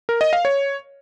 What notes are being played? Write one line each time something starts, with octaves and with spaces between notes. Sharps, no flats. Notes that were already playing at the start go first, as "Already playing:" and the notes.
A#4
D#5
F5
C#5